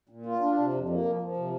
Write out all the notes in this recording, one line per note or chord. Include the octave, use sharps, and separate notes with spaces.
A#2
F4
D4
C3
F2
A#3
F3
F3
C3